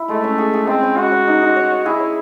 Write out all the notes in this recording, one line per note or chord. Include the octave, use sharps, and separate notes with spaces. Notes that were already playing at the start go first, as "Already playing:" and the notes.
Already playing: E4
G#3 A3
C#4
G#4
G#4
G#3 C4
C#4
G#3 F#4
C#4
D#4
D#4
C#5
C#5
E4 G#4
C#5